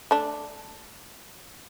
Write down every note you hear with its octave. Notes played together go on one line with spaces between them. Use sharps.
A3 D4